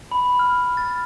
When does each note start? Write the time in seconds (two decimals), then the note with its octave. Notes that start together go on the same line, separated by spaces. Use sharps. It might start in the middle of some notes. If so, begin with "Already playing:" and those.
0.11 B5
0.39 F6
0.77 A6